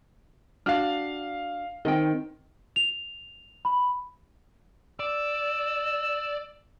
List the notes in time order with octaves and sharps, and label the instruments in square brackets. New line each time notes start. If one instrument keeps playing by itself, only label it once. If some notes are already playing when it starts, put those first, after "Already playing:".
[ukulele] D4 F#4 [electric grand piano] F5 F6
[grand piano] D#3 C4 [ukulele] D#5 G5
[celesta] F7
B5
[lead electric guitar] D5 [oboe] E6